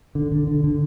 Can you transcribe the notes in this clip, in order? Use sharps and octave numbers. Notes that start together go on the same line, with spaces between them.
D3
D3
D3
D3